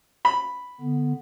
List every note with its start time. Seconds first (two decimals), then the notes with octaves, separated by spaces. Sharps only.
0.25 B5
0.81 D3 B3